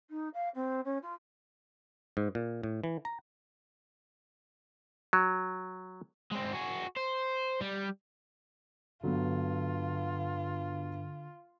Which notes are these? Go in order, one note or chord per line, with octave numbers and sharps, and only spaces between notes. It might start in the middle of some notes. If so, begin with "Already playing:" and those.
D#4
F5
C4
C#4
F4
G#2
A#2
A2
E3
A#5
F#3
G#3 C4
F#4 G#4
C5
G3
G2 D3 F#3 B3 F4